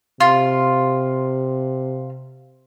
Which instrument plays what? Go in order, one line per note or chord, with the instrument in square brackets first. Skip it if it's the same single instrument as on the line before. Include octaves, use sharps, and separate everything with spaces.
[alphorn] C3 [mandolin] F4